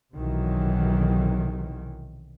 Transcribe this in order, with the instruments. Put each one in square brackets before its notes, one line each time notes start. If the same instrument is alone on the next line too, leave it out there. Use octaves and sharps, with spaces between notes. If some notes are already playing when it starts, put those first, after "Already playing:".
[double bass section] B1 C3 D#3 E3 F#3